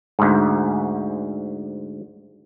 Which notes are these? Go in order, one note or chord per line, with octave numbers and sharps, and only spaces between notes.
D2 G#2